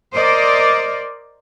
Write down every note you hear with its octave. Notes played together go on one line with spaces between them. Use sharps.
A#4 C5 D5 D#5